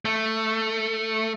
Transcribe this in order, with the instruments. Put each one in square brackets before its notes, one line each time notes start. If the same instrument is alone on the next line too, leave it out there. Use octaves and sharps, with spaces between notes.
[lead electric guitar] A3